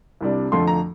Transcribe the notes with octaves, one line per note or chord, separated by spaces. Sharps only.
C2 C3 G3 D4
F2 D3 F3 A3 C6
A#5